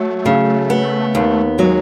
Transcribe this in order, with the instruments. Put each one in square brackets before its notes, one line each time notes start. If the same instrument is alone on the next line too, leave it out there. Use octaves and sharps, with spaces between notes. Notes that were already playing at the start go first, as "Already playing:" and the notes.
Already playing: [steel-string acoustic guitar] F#3 [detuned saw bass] A3
[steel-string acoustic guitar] C#3
B3
D#2
[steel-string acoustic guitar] F#3 [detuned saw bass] G#3